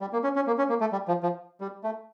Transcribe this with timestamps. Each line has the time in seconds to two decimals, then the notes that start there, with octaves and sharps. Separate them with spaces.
0.01 G3
0.13 A#3
0.24 C#4
0.36 C#4
0.47 A#3
0.58 C#4
0.69 A#3
0.81 A3
0.92 G3
1.08 F3
1.23 F3
1.61 G3
1.84 A3